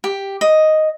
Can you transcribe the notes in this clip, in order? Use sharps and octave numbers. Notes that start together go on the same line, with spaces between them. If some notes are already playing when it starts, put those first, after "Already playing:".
G4
D#5